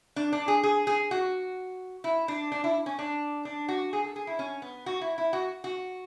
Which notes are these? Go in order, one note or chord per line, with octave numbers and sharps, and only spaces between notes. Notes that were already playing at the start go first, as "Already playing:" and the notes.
D4
D4
G#4
G#4
G#4
F#4
E4
D4
D4
E4
C#4
D4
D4
F#4
G#4
A4
G#4
E4
C#4
B3
F#4
E4
E4
F#4
F#4